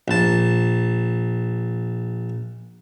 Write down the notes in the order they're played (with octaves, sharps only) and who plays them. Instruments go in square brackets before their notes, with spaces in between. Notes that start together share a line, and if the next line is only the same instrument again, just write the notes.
[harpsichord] A#1 A5